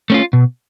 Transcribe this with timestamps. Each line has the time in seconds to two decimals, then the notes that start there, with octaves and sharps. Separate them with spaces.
0.10 A3 C#4 F4
0.33 B2